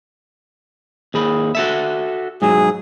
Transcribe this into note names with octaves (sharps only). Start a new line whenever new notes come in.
D#2 G#4 B5
F#4 A4 E5
G#2 F#3 G#4